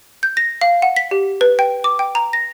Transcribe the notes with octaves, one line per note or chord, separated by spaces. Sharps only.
G6
A#6
F5
F#5
B6
G4
B4
G5
D6
G5
A#5
A#6